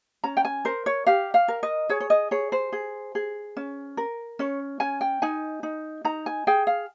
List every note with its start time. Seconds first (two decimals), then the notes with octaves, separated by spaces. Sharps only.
0.24 C#4 A#5
0.37 G5
0.45 G#5
0.65 A#4 C5
0.86 C#5
1.07 G4 F5
1.34 F5
1.48 A#4
1.63 D#5
1.89 G#4 C#5
2.00 C#5
2.10 D#5
2.31 G#4 C#5
2.52 C5
2.73 G#4
3.15 G#4
3.57 C#4
3.97 A#4
4.39 C#4 C#5
4.80 C#4 G#5
5.01 G5
5.22 D#4 G#5
5.63 D#4
6.05 D#4 A#5
6.26 G#5
6.47 G#4 G5
6.67 F5